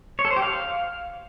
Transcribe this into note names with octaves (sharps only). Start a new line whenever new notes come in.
C#5
A4
C5
G4
F5